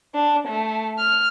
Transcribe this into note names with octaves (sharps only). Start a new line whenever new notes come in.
D4
A3
F6